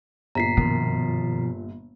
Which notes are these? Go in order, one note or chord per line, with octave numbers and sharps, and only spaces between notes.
G1 A#2 A#5 B6 C7
F#2 B2 D#3 F3